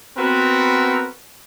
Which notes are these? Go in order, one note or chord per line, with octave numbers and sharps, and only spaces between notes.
B3 C4 F#4 A#4 B4